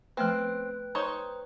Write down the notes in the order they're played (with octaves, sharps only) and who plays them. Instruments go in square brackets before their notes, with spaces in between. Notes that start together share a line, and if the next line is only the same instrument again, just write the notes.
[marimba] F3 A3 B3 [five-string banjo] C4 [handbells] B4 G5 F#6
[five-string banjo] D#4 C5 C#5